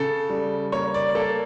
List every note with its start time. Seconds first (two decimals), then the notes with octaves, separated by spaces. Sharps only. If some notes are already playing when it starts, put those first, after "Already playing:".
Already playing: C#3 A4
0.30 G3
0.72 A#3 C#5
0.94 D5
1.15 A#3 A4